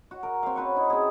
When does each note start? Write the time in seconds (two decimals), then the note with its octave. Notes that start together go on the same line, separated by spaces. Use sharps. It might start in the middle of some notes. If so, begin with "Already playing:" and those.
0.11 F#4
0.23 A#4
0.43 C4 F5
0.56 C#4 F#4 B4 C#6
0.75 D#4 E4
0.90 C4 G#4